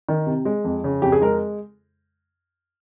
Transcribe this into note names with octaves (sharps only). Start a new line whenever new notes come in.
D#3
C3
G#3
F2
C#3
F2 G4
G#4
G#3 A#4